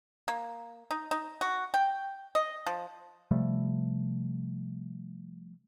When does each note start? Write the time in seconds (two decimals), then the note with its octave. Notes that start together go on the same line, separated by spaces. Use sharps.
0.28 A#3
0.91 D#4
1.11 D#4
1.41 F#4
1.74 G5
2.35 D#5
2.67 F3
3.31 C3 F3 G3 A3